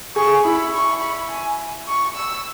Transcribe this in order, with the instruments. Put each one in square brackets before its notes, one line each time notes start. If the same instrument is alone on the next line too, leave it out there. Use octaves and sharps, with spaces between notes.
[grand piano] G#4 [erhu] C#6
[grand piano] E4 [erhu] B5
[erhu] C#6
B5
G#5
C#6
E6